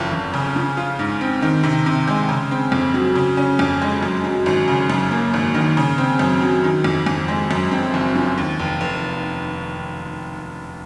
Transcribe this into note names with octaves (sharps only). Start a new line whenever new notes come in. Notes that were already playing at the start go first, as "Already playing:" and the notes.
Already playing: F#1 F2 F3
F#1
C#3
F3
F4
G#2
C4
D#3
C3
C3
G#3
C#3
C4
F2
F#3
C#3
C#4
F2
G#3
F#2
F#3
G#1
C#3
F#2
A#3
G#1
D#3
C#3
C4
F#2
F#3
D#3
F2
F2
G#3
F#2
C4
F#1
F3
D#2
F1
F1